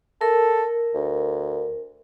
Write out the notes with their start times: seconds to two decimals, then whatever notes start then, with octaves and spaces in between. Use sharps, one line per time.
0.21 A4 A#4
0.95 D2